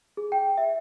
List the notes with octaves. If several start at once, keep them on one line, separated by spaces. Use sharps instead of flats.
G#4
G5
E5